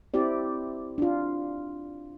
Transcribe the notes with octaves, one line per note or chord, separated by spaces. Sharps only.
C4 E4 G4 D5
D4 F4